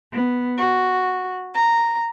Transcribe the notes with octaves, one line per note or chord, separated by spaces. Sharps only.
B3
F#4
A#5